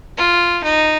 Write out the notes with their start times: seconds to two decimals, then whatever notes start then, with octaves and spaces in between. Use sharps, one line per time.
0.18 F4
0.64 D#4